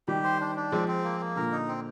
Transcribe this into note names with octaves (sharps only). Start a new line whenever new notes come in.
D#3 G3 G4
C5
D4
D4
F3 G#3 C4
C4
A#3
A#3
A#2 D3 A#4
D#4
C4